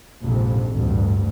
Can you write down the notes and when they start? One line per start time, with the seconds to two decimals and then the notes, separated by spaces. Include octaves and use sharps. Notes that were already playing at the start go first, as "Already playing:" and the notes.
0.24 A#1 F2 G#2 C3
0.70 A1 D2 G2